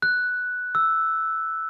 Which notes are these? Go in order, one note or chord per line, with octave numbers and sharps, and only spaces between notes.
F#6
E6